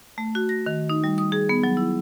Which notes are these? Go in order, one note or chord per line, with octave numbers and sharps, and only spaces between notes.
A3
F#4
A#6
D#3
D#4
G3
D#6
G#4
B3
F#3
E4